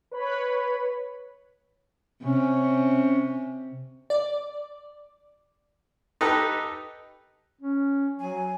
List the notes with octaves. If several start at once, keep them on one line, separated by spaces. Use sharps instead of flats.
B4 C#5 B5
C3 C#4
D5
D#4 G4 A4 B4 A#5
C#4
F#3 G#5